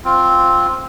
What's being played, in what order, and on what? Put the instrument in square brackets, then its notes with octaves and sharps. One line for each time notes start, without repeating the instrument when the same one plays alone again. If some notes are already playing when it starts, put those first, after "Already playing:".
[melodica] C4 F4